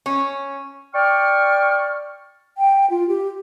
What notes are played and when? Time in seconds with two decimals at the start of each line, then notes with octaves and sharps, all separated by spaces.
0.06 C#4
0.94 D5 G5 C#6 F6
2.58 G5
2.90 F4
3.08 G4